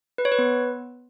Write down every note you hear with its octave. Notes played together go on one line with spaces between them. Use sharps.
B4
C#5
B4
B3